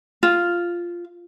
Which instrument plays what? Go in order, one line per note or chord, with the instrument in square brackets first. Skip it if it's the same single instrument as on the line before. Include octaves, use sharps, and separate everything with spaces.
[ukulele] F4